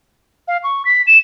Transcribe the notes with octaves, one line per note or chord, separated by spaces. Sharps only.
F5
C#6
B6
E7